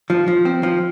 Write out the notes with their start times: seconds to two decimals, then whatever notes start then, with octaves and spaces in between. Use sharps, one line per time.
0.10 F3
0.28 F3
0.45 C4
0.63 F3